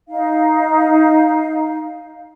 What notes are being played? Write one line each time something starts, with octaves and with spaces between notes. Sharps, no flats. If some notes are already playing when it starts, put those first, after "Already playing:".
D#4 F5